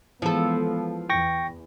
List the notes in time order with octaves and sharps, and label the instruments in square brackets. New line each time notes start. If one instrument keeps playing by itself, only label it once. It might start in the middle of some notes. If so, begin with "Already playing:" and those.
[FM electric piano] E3 G#3 [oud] F3 A4 [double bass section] B3
[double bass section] E2 [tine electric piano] G5 C#6 A#6